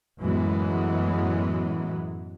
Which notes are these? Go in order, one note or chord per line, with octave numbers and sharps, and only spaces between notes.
F#2 A2 E3 F#3 G#3 B3